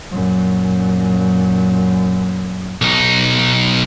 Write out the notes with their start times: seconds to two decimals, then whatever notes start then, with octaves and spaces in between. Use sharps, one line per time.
0.11 F#2 A#2
2.82 B1 D#4